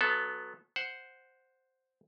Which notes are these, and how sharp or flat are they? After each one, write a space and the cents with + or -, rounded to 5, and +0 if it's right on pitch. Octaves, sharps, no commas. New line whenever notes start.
F#3 -20 B3 +0 A4 -15
C5 +0 F#5 +0